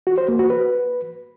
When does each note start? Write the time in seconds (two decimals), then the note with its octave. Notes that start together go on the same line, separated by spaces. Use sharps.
0.07 F#4
0.18 C5
0.28 A#3
0.39 F#4
0.50 B4